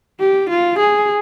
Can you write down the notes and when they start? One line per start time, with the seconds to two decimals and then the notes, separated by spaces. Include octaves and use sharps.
0.20 G4
0.50 F4
0.79 G#4